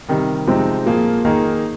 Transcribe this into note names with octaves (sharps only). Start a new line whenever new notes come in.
C3 D#3 G3
C3 F3 G#3 C4 D#4
A#2 F3 A#3 F4 G#4
D#3 A#3 D#4 G#4